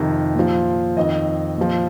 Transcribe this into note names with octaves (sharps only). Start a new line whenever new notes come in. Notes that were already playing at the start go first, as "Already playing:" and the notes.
Already playing: F2 C3 D#3
A#2 F3
F2 D#3 D#5
A#2 F3